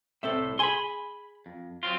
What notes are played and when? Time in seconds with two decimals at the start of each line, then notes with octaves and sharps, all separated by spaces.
0.23 C2 A2 C4 A4 E5
0.59 G#4 G#5 B5 C6
1.46 F2
1.83 F#3 C4 F4